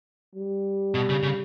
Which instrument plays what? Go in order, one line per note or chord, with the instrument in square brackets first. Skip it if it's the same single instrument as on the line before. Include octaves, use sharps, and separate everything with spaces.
[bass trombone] G3
[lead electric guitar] B2
C#3
C#3